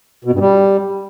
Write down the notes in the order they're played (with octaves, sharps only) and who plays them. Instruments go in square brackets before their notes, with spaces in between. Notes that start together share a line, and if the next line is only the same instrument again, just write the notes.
[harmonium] B2
G2
G3